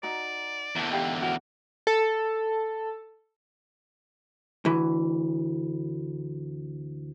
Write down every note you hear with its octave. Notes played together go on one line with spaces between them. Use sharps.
D#4 F#4 A#4 D5
E2 D3 E4 B4 A5
D#4 G4 F5
F#4 A#4 F#5 G5
A4
D2 E3